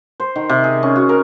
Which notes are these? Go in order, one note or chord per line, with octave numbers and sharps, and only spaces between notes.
C5
D#3
C3
G#4
C#4
F#4
A#4